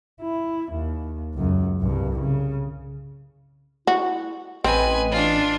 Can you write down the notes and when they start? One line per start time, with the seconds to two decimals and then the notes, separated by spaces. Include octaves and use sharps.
0.22 E4
0.72 D#2
1.34 C#2 F#2
1.81 C2 G2
2.19 C#3
3.87 E4 F#4
4.64 A1 C4 B4 D#5 G#5
5.11 D4 F4